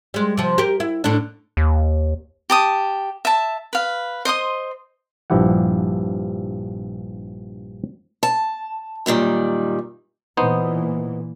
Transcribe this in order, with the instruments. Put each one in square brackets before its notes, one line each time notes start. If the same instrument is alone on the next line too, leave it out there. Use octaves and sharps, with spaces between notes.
[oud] G3 G#3
C3 F3
G4 A#4
E4
A2 D3 D4
[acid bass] D#2
[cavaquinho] G4 A5 D#6
E5 A5
B4 F5
C5 D#5 C6 D#6
[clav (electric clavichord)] A#1 G2 F3 E4 G4 F#5
[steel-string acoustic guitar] A5
F#2 A#2 D#3 G3
[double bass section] A#2 E3 [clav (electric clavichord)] B3 D#4 C5